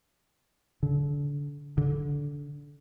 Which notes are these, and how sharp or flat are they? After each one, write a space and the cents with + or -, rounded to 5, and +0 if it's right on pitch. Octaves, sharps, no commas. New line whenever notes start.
D3 -30
D3 -15